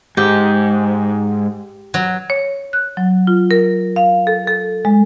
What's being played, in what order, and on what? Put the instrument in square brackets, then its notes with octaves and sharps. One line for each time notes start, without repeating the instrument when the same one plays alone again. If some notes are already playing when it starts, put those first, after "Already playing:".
[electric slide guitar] G#2 [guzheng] G4
[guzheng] F#3
[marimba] C#5
F#6
F#3
F4
A#4
F5
A4
A4
G#3